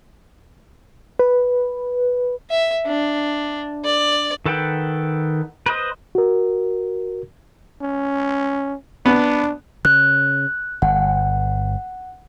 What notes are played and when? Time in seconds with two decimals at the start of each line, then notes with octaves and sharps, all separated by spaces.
1.19 B4
2.50 E5
2.86 D4
3.84 D5
4.46 D#3 A4 B4 F#5 G5
5.66 B4 C5 D#5
6.15 F#4 A#4
7.82 C#4
9.06 B3 D4
9.85 C#3 F#6
10.82 G1 F#5